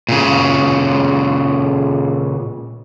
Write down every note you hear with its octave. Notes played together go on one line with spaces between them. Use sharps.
A#2 C#3